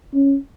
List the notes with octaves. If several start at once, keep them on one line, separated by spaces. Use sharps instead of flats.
C#4